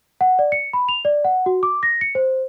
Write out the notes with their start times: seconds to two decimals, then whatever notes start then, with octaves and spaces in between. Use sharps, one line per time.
0.21 F#5
0.39 D5
0.52 C#7
0.73 B5
0.89 F7
1.05 D5
1.25 F#5
1.46 F#4
1.63 D6
1.83 A#6
2.01 C#7
2.15 C5